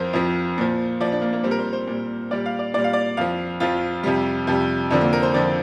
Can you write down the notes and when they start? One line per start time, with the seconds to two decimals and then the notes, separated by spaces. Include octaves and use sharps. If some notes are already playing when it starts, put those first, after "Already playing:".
Already playing: F2 F3 A#4 C5
0.13 F2 F3
0.58 A#2 F3
1.00 A#2 F3 D5
1.12 D4
1.22 A#3
1.33 A#3
1.43 A#2 G3 C4
1.51 A#4
1.59 C5
1.73 C5
1.87 A#2 G3
2.31 A#2 G3 D5
2.46 F5
2.59 D5
2.74 A#2 G3 D5
2.84 F5
2.93 D5
3.17 F2 F3 F5
3.60 F2 F3 F4
4.03 F2 C3 G3
4.47 F2 C3 G3
4.90 F2 D3 F3 D4
5.01 A#3
5.13 A#4
5.23 C5
5.34 F2 D3 F3 D5